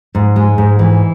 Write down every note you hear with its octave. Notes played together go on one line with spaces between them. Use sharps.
G#2
G#3
G#2
E3